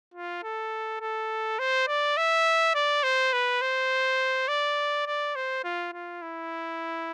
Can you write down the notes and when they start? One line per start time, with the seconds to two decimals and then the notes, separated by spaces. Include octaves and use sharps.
0.14 F4
0.43 A4
1.01 A4
1.59 C5
1.88 D5
2.17 E5
2.74 D5
3.03 C5
3.33 B4
3.61 C5
4.48 D5
5.07 D5
5.35 C5
5.64 F4
5.93 F4
6.22 E4